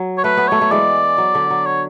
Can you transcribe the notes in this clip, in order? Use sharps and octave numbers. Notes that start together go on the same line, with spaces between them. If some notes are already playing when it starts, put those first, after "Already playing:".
Already playing: F#3
C#5
A3 B4
B3
F#3 A3 C#5
A3
E3 G#3 D5
F#3
D3
F#3
C#5